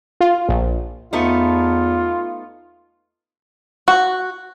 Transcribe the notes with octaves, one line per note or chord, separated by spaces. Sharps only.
F4
A#1
E2 A3 B3 D#4 F4
F#4